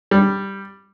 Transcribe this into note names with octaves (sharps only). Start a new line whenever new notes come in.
G3